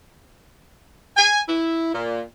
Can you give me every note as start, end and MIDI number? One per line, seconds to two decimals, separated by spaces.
1.17 1.40 80
1.48 1.92 64
1.94 2.22 46